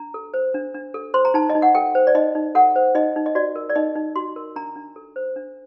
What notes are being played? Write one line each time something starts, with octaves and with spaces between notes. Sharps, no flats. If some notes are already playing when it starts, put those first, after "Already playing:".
Already playing: D4 A#5
A4
C5
D4
D4
A4
C5 C6
A#5
D#4 A5
D#5
D#4
F#5
A4 G5
C5
D5
D#4 D#5
D#4
A4 F#5
C5
D#4 D#5
D#4
D#5
F#4 D5
A#4
D5
D#4 D#5
D#4
F#4 C6
A#4
D4 A#5
D4
A4
C5
D4